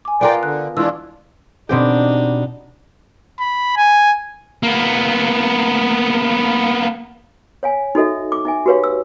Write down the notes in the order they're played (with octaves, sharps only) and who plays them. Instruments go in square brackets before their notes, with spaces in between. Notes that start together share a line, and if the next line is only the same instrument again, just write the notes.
[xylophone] G#5 D6
[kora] B3 F4 A#4 [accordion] D5 G5
[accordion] D3 [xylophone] F#6
[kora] E3 C#4 [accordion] G#3 D4 F4 [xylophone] E6
[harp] B2 C4 G4 [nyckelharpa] D4 D#4
[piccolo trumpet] B5
G#5
[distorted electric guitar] A#3 B3
[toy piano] C#5 F5 G#5
D#4 F#4 A4 D#5 E5
D6
D#4 E5 G#5
F#4 G4 B4 C#5 F5
E6